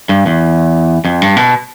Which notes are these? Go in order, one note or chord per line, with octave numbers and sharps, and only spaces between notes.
G2
E2
F2
G2
B2